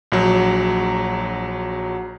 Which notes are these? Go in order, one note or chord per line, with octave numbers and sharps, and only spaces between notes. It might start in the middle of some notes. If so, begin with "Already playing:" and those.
A#1 F#3